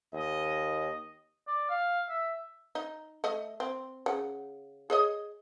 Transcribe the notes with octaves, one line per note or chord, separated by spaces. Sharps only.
D#2 D#5
D5
F5
E5
D#4
A3 D#5
C4
C#3 F#5
G#4 C#5 D#5